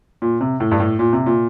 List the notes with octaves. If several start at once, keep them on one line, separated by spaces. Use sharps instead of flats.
A#2
C3
A2
G2
A2
A#2
C3
A#2